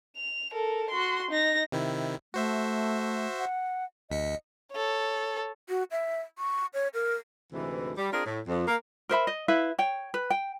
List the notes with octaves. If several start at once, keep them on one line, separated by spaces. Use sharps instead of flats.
F7
A4 A#4
F#4 C6
D#4 A#6
C3 D#3 E4
A3 F#4 C5 E5
F#5
D2 D#5 B6 C#7
A4 C#5
F#4
E5
C#6
C#5
A#4
D2 G#2 C3 E3
G3
C4 D4 F4 G#4 A#4
A2
F2
A#3 A#4
A#4 C5 E5 B5
D#5
E4 B4 E5 F5
C#5 G5
B4
G5